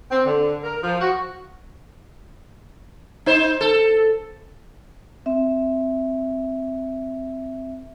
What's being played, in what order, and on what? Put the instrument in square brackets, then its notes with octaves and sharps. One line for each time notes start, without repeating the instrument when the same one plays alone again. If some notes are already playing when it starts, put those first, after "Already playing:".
[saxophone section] C4
D3
A#4
F3
F#4
[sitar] D#4 C5
A4
[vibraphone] C4 E5